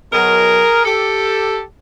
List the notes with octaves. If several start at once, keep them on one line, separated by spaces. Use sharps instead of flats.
B2 F#3 G#4 A#4
G4 A4